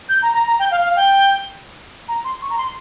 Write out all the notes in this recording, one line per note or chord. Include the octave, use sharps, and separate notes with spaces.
G6
A#5
A#5
A#5
G5
F5
F5
G5
A#5
C6
C#6
A#5
C6